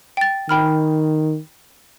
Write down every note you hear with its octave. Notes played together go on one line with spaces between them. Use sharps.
G5 A6
D#3 G5 B5 F6